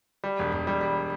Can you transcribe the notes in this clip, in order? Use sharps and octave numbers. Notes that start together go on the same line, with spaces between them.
G3
E1
E1
G3
G3